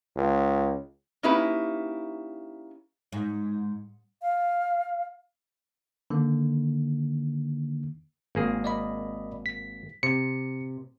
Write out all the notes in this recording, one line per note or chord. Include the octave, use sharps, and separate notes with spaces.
C#2
A#3 C#4 D#4 E4 G4 B4
G#2
F5
D3 D#3 A#3
G#1 A#3 G#4
D5 D#5 B5
B6
C3 C#7